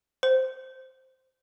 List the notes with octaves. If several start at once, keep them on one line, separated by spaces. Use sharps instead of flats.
C5